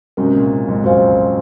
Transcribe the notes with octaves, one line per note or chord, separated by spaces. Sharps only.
G#2 C3 C#4 F#4 A#4
A#2 C#3
F2 G#2
F#2 F#4 C5 F5 G#5
F2